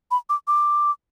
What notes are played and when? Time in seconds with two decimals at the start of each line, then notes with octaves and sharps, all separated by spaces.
0.11 B5
0.29 D6
0.48 D6